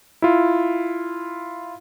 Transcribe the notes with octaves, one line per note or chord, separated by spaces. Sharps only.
E4 F4